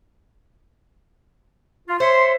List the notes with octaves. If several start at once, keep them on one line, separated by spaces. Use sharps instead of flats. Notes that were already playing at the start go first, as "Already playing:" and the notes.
F4
C5 C#5 E5 C6